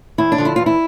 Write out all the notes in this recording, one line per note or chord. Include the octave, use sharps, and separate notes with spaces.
E2 E4
D4
D3 F3
E4
E2 F4
E4